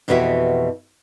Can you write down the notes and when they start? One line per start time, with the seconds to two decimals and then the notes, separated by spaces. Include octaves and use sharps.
0.08 F2 B2 E3 F#4 G4 E5